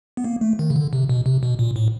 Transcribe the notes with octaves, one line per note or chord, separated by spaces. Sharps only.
B3
A#3
A3
D#3
C#3
D3
C3
B2
C3
B2
A#2
A2